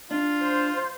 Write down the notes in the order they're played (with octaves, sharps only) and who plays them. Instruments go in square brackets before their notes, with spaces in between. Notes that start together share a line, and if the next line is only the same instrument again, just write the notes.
[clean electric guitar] D4 [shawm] F4
[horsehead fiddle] C5